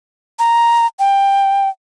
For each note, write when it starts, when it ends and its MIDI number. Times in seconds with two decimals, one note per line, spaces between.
0.39 0.86 82
0.99 1.69 79